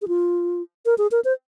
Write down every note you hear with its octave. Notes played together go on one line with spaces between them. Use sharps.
G#4
F4
A#4
G#4
A#4
C5